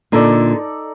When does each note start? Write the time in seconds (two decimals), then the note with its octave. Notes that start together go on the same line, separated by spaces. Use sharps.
0.12 A#2 D3 D#4 A4 D5